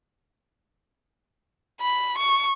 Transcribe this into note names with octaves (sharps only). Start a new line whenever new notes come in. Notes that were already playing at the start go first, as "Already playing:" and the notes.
B5
C#6